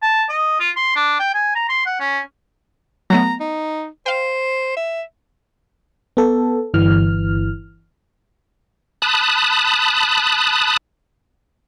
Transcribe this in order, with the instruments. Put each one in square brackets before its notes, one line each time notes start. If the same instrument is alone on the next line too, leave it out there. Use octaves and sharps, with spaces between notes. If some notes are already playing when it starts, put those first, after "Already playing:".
[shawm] A5
D#5
F4
C6
D4
G5
G#5
A#5
C6
F#5
C#4
[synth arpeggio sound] F#3 A3 B3 [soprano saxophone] A#5
[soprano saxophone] D#4
[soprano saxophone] C5 [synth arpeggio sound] F5 G5
[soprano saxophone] E5
[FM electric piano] B3 A4
G1 E3 F6
[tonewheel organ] A5 B5 D#6 F#6